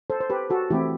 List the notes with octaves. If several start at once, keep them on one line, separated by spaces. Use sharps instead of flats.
A4 C5
C5
G4 B4
F#4 A4
E3 A3 C4 E4 G4